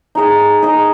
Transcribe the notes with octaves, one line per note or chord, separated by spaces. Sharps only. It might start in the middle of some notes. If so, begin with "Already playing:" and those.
D#4 G#4 D#5
D#4 G#4 D#5